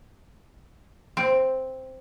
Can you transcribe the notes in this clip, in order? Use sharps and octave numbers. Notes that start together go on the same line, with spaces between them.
C4